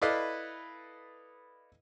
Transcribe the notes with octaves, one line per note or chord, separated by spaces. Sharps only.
E4 A4 B4 D5 D#5 F5